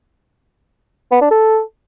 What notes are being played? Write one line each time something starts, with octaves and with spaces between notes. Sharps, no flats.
B3
D4
A4